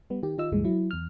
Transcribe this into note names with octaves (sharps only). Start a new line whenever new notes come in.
G3 B3
D#3 G4
D#3 F4 D#5 E6
C#2 G2 A#2 E3 G#3
F#3 E4
E2 F6